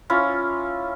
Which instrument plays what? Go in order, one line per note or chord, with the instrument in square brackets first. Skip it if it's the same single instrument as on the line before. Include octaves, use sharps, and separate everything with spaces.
[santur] C#4 E4 F4